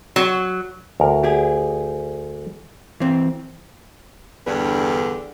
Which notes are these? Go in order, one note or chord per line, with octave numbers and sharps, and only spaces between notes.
F#3
D2 A#4
G4 G#4
E3 C4 F5
E2 G2 D3 B4